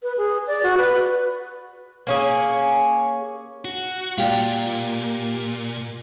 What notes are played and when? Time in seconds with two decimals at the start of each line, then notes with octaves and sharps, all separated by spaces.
0.03 B4
0.18 G#4
0.47 D5
0.63 F#4
0.78 B4
2.07 A#3 C#4 G#4
3.65 F#4
4.18 A#2 F4 G4 D5